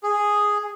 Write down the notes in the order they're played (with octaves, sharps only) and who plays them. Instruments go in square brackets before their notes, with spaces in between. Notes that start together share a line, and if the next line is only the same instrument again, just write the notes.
[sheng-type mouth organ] G#4